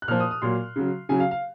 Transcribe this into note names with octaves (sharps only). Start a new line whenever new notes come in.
F#6
A#2 F3 F6
D#6
D#6
A#2 F#3 C6
C#3 F#3
C#3 F#3 G#5
F5
F5